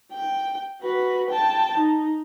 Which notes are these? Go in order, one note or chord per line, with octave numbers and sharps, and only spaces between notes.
G5
F#4 B4
G5 A5
D#4